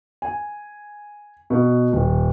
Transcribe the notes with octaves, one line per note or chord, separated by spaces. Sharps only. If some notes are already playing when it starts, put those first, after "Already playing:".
G#5
B2
D#1